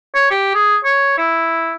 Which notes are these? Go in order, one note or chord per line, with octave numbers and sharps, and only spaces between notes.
C#5
G4
G#4
C#5
E4